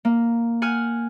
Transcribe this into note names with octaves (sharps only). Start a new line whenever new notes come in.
A#3
F#5 G#5 F6